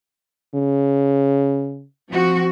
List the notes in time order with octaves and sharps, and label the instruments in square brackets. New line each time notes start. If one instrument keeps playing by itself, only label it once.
[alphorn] C#3
[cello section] F3 C4 F#4